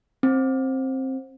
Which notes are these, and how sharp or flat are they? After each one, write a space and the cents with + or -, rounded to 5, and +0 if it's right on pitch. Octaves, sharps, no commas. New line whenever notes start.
C4 +15